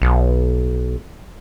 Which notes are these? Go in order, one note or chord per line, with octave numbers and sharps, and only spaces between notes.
B1